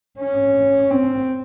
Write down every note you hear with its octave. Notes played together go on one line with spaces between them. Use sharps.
C#4
C4